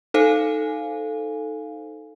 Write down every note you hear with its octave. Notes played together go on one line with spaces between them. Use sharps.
D#4 A4 C5 F5 G#5